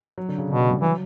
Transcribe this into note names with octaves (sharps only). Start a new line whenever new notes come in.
F#3
D3
C#3
B2 D3
F#3
G3
E3 F#3